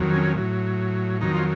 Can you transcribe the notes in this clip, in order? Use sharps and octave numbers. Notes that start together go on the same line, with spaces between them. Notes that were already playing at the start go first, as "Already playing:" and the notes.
Already playing: F2 D#3 F#3
C#4
A2 F#3
F2 D#3 F#3 D#4
F4